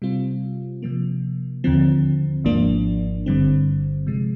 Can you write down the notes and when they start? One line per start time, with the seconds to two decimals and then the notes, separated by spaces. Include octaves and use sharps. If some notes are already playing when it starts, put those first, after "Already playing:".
0.02 C3 G3 C4 F4
0.83 C3 F3 A#3
1.64 D#2 D3 F3 C4
2.44 G#1 G#2 F3 A#3 D4
3.26 G1 G2 D3 G3 C4
4.07 C3 F3 G#3